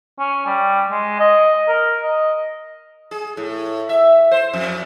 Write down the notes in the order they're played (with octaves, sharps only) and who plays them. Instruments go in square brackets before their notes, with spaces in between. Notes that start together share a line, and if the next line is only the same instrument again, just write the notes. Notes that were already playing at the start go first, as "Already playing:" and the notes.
[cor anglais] C#4
G3
G#3
D#5
A#4
D#5
[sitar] G#4
A2
E5
C5
F2